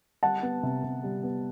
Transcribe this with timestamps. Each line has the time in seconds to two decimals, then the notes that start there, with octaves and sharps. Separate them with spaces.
0.23 G3 F#5 A5
0.42 B3
0.63 C3
0.84 C3
1.04 G3
1.23 B3